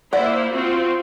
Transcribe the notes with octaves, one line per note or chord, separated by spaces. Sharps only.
A#3 E4 C5 D5 F#5
C4 F4 F#4